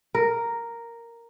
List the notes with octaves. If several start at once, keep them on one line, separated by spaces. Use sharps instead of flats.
A#4